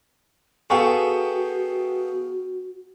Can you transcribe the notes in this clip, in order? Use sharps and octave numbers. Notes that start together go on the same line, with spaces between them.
B3 F#4 G#4 A4 F5 G5 C#6